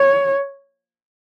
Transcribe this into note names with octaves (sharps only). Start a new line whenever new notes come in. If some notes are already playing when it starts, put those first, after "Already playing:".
Already playing: C#5